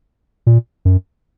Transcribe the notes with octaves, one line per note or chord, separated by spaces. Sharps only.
A#2
F#2